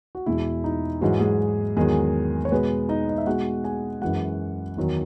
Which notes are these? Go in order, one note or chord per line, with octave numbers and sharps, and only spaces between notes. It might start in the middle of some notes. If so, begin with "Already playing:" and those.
F#4
E2 B2 G#3 E4
D#4
G#2 E3 F#3 G#3 F#4
G#3 G#4
E2 D#3 F#3 G#3 G#4
C#5
B2 G#3 B3 B4
D#4 D#5
D#5
E5
B2 G#3 F#4 F#5
G#4 G#5
F#2 E3 G#3 F#4 F#5
E2 D#3 F#3